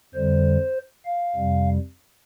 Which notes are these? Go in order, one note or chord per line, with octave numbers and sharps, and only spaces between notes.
F2 D3 G3 C5
F5
F2 C3 G3